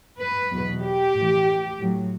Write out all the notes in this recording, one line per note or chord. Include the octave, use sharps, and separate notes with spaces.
B4
E2 B2 F#3
G4
A2 E3
A2 F#3